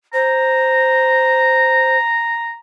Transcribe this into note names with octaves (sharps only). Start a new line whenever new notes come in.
C5 A#5